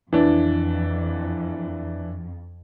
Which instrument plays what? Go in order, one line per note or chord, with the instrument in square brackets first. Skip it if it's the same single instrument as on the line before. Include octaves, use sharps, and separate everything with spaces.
[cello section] F2 [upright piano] E3 D4